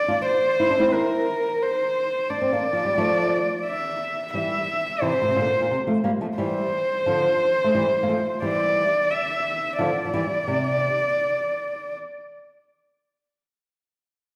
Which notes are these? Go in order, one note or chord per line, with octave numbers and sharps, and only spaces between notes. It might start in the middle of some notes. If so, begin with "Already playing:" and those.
Already playing: D5
D4 F4
C5
E4
D4
C4 E4
A#4
C5
D4 D5
C4
A#3 D4
F3
G3
F3 A3
E5
E3 G3 E5
C3 E3 C5
A#2
C3
A#2 D3
A#2
C3
F3 A3
G3 A#3
F3 A3
E3 G3 C5
D3 F3
A3
E3 G3
A#3
F3 A3
E3 G3 D5
E5
D3 F3 D5
F3
E3 G3
C3